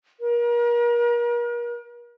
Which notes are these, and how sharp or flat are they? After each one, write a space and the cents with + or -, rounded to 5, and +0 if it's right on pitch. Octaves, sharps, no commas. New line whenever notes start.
A#4 +40